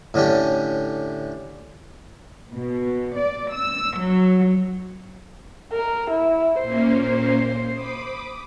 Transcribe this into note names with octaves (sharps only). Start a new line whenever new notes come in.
A2 D3 C#4 D4 G4
B2
D5
E6
F#3
A#4
E4
A#2 A#3 C#4 C5
B5 D6 D#6